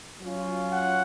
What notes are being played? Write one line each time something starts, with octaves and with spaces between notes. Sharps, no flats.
F#3 C#4 F4
F#5